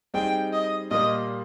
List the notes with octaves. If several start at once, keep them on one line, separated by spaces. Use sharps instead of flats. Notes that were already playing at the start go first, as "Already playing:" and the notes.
G3 C4 D#4 G#4 G5
D#5
A#2 G3 A#3 D#5